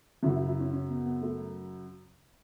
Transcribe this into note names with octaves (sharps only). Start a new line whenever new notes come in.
F#2 C#3 F#3 E4
E4
E4
C#4
C#4
B3
B3
A3